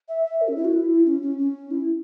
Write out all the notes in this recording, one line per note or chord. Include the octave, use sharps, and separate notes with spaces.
E5
E5
A#4
C#4
E4
F#4
E4
C#4
C#4
C#4
E4